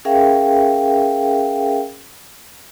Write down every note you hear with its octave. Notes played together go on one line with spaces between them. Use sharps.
C#4 G#4 A#4 E5 F5 G5